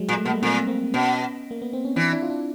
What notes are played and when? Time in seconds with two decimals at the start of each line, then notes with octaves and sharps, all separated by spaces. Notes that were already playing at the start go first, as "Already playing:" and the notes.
Already playing: F#3 G#3
0.09 A#2
0.17 A3
0.25 B2 A#3
0.33 G3 A3
0.42 A#2 A#3 C4
0.67 A#3 C4
0.93 B2 B3 C#4
1.51 A#3
1.62 B3
1.73 C4
1.85 C#4
1.96 E3 C4 D4
2.13 D4 E4
2.22 F4
2.30 D4 E4